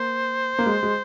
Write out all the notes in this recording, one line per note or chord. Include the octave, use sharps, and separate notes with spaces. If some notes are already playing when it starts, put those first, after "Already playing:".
Already playing: A#3 C5
A#3
G#3
G#3